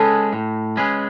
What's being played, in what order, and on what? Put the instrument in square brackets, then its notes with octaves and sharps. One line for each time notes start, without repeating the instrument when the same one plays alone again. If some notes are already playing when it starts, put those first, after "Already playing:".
Already playing: [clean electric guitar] G#3 C#4 G#4 B4 [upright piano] A4
[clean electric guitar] A2
G#3 C#4 G#4 B4